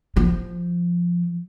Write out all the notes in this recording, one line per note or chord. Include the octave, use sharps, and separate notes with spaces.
F3